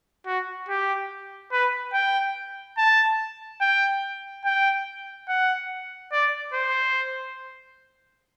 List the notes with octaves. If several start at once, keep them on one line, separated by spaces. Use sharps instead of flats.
F#4
G4
B4
G5
A5
G5
G5
F#5
D5
C5